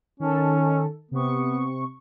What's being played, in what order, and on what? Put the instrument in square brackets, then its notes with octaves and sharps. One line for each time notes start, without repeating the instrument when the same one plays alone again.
[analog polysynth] D#3 A4 [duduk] C#4
[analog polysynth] C3 C#6 [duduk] B3